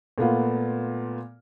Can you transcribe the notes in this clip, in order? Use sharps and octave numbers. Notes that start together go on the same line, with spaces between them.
A#2 A3 B3 F4